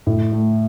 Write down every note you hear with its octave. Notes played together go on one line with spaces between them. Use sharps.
A2
A3